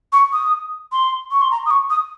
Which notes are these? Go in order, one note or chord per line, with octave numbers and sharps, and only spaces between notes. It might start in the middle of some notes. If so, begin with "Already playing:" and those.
C#6
D#6
C6
C#6
C6
A#5
D#6
C#6
D#6